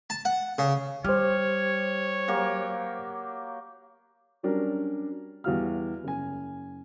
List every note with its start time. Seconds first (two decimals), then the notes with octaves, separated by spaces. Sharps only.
0.10 A5
0.25 F#5
0.58 C#3
1.04 G3 G4 C5 C#5 F6
2.28 F#3 A#3 G4
4.43 F#3 G3 C#4 D4 A#4
5.44 E2 G3 F#4 F5 F6
6.04 F#1 G#5